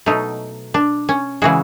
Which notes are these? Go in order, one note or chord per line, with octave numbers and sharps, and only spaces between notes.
B2 F#3 A3 D#4
D4
C#4
C#3 E3 G#3 F#4